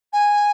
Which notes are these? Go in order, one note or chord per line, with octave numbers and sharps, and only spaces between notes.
G#5